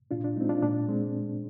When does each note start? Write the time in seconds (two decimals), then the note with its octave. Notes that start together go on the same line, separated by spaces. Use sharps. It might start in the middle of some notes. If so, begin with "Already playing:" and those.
0.11 A#2 D4 F4
0.24 D4
0.36 G#3 C4 D#4
0.49 D4 F4
0.62 A#2 D4
0.88 G#3 C4